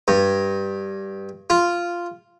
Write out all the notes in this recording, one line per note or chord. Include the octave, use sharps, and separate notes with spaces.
G2
F4